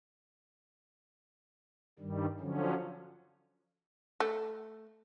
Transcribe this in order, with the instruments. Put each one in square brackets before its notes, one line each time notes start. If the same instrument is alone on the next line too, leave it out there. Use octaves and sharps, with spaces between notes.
[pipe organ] G2 D#3 G3
D3 F3 F#3 C#4
[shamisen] A3